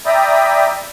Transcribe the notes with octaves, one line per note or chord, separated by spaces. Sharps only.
D5 E5 G5 A#5 B5 D#6